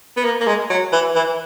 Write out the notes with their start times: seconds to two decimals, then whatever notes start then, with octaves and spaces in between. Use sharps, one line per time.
0.17 B3
0.24 A#3
0.40 A#3
0.47 G#3
0.70 F#3
0.93 E3
1.15 E3